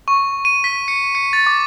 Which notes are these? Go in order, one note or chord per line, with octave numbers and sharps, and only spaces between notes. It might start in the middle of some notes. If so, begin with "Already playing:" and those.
C#6
D#7
B6
C#7
C#7
A6
D6